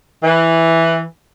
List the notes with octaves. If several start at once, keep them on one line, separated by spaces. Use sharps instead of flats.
E3